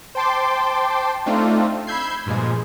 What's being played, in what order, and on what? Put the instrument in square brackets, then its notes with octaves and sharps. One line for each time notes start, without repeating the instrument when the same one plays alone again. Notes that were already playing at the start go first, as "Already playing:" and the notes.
[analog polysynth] C5 G5 A5 C6 D6
A3 C4 D4 D#4 F4
B5 E6 G6 G#6 C7
G2 A#2 F3 G#3